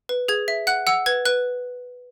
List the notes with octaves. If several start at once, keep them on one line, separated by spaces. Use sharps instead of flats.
B4
G#4 G#6
E5
F#5 F#6
F#5 E6
B4 G#6
B4 F#6